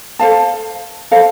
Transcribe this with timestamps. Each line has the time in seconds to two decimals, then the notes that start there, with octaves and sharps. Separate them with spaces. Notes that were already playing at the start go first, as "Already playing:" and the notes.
0.19 A4 C5 F5 A5
1.11 A4 C5 F5 A5